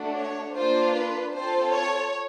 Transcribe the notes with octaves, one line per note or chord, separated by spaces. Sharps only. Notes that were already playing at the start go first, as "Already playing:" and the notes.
Already playing: A3 D4 F#4
C#5
A#3 D4 F4 C5
B4
C4 F4 A4 C5
C#5